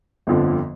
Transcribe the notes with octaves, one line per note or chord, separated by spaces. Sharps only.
G1 F2 D3 F3